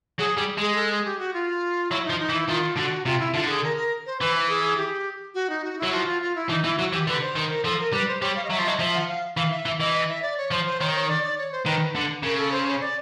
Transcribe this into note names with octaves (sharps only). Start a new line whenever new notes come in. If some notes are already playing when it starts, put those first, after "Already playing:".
F#3 G#4
G3
G#3 G#4
A4
G#4
G4
F#4
F4
F#3 E4
F3 D#4
D#4
E3
E4
D#3 F4
D3 F#4
C3 F4
E4
D3 F4
A4
G#4
A#4
A#4
C5
E3 B4
G#4
G4
F#4
D#4
F#4
F#3 E4
F3 F#4
F4
F4
E4
E3 D#4
E3 E4
F#3 F#4
E3 G4
D3 B4
C5
D#3
A#4
F3 A4
A#4
G3 B4
C5
G3 C#5
F5
D#5
F#3 E5
F3
F#3 D#5
F3 E5
F#5
F5
E3 F5
E5
E3
E3 D#5
D#5
E5
D5
C#5
F3 C5
C5
D#3 C#5
C#5
D5
D5
C#5
C5
D#3 B4
D3
C#3 A#4
A4
C5
C#5
D5